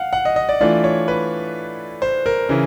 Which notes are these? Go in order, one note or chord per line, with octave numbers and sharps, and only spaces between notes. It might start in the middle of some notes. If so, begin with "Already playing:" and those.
Already playing: F5 F#5
F#5
D#5
D#5
D5
E3 A3 D4 F4 D5
C#5
B4
C5
A#4
C#3 E3